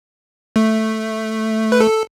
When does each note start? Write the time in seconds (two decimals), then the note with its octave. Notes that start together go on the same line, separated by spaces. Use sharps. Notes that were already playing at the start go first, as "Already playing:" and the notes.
0.56 A3
1.72 B4
1.80 A4